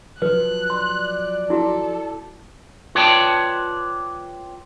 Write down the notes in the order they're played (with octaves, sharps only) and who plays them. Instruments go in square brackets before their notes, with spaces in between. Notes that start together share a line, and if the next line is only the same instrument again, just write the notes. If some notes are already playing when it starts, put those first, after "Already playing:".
[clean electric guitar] F3 F#3 [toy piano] B4 [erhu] F#6
[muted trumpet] D5 [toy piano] C6
[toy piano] E4 F#4 [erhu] A4
[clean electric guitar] F4 B4 C#5 D5 G5 A5